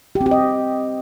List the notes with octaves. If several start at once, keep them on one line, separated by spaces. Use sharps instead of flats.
G4
C4
G4
D#5